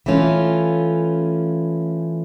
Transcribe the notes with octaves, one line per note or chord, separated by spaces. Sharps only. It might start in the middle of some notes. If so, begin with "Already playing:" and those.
E3 A3 C#4 F4